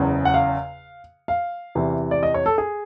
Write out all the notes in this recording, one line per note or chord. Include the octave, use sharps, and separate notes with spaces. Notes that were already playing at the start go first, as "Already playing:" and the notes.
Already playing: F#1 E2 C#3
F#5
F5
F5
E2 C3 E3
D5
D#5
C#5
A4
G#4